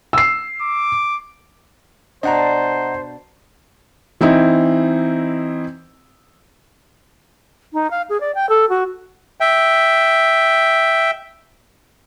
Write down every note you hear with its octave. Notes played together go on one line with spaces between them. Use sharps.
E6 C7
D6
B2 D4 C5 D#5 F#5 A#5
E3 C4 D#4 E4
D#4
F5
G#4
D5
G5
A4
F#4
E5 G5